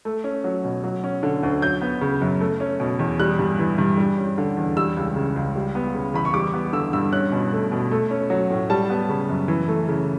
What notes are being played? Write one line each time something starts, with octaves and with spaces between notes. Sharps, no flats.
A3
C#4
F#3
B2
F#3
C#4
D3
D2
F#3 G6
B3
C#3
F#2
A3
C#4
B2
E2
G3 F#6
G2
E3
G2
G3
C#4
D3
E2
G3 E6
C#2
C#3
C#2
G3
B3
C#3
E2 B5
C#6
G3 D6
B3
D3 E6
G2 E6
C#4 F#6
B2
A3
B2
A3
C#4
F#3
A2
G3 A5
B3
C#3
F#2
E3
A3
C#3